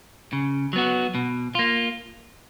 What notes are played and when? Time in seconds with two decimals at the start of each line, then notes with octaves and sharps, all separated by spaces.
0.33 C#3
0.73 F#3 B3 F#4
1.15 B2
1.55 A#3 F4